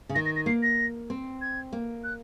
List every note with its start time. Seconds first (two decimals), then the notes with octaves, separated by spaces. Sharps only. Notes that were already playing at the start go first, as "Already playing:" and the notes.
0.09 C#3
0.15 D#3 A#6
0.26 A#6
0.36 A#6
0.46 A#3 C7
0.63 A#6
1.10 C4
1.41 G#6
1.73 A#3
2.04 F#6